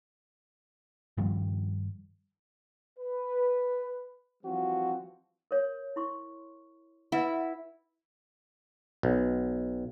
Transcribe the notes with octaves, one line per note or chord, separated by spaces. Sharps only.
G2 D#3 F3 G3
B4
E3 F3 G3 C4 F#4
A#4 C#5
E4 C6 C#6
E4 B4 E5 F#5
B1